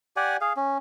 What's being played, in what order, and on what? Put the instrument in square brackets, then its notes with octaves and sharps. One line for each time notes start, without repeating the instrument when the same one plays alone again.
[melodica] G4 D5 F#5 G#5
G#4 F5
C#4